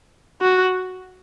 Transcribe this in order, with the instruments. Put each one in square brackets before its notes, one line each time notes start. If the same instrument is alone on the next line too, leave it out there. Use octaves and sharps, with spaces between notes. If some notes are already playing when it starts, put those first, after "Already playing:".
[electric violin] F#4